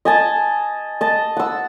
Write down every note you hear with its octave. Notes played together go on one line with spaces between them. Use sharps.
D#5 G#5 A5
D#5 A5
F#5 E6